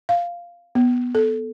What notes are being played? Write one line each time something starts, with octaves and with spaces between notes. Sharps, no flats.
F5
B3
A4